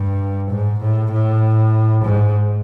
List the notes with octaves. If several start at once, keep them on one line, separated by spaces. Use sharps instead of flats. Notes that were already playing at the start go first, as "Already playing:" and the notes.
Already playing: G2
G#2
A2
A2
G#2